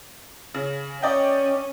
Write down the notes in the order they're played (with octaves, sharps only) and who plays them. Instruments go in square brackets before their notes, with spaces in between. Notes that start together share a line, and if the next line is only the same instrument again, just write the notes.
[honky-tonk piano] C#3
[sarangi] C#4 [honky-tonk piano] D5 D#5 G5